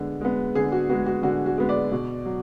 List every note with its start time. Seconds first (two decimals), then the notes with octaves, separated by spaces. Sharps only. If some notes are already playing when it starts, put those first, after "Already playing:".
Already playing: D3 G#3 B3
0.21 G#3 B3
0.55 D3 G#4
0.72 F#4
0.89 G#3 B3 F#4
1.06 F#4
1.23 D3 F#4
1.46 F#4
1.58 G#3 B3
1.69 D5
1.91 B2
2.26 F#3